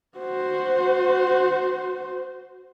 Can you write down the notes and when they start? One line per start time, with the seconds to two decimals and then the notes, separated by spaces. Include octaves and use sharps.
0.19 F#4 C5